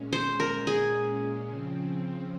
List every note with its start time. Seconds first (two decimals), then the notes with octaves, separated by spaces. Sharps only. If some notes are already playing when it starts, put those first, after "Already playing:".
Already playing: A#2 G#3 C#4
0.13 C5
0.40 A#4
0.67 G#4
1.48 C#3 F3 C4